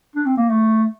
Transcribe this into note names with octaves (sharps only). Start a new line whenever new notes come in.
D4
C4
A#3
A3